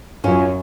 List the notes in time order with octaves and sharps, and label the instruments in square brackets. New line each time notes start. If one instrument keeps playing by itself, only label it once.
[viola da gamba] F#2 [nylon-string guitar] C#4 F4